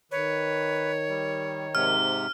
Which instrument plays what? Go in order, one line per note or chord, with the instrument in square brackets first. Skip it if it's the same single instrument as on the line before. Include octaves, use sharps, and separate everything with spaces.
[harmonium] D#3 [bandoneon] B4 [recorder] C#5
[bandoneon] G3
[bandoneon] G#2 C3 [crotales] F6